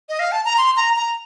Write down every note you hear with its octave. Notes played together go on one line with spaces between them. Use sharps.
D#5
F5
A5
A#5
C6
A#5
A#5